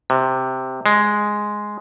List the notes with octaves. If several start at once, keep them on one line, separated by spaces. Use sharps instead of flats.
C3
G#3